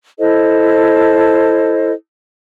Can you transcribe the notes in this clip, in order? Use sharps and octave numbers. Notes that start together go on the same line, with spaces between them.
E4 A4 C5 D#5